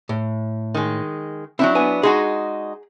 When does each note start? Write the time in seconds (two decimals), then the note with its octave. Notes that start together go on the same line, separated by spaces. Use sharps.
0.09 A2
0.75 D#3 G#3
1.59 F#3 C4 D4 E4
1.75 B3 G#5
2.03 G#3 D#4 F#4 G#4